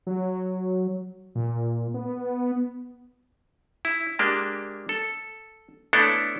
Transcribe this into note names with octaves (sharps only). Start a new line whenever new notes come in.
F#3
A#2
B3
E4
G#3 A#3 D4 G4
A4
A3 B3 D4 E4 A4 C#5